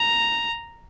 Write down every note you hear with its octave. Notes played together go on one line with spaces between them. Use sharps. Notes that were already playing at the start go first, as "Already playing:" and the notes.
Already playing: A#5